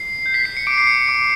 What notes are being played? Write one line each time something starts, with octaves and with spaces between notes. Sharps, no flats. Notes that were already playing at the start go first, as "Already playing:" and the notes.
Already playing: C7
G6
B6
C7
C#7
D6 D7
C7
C#7
D6 D7